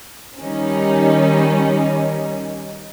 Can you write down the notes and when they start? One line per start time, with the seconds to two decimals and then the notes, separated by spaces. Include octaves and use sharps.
0.40 D#3 G3 C#4 D#4